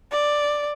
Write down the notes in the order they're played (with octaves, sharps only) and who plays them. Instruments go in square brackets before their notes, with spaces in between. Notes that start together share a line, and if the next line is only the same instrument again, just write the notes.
[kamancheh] D5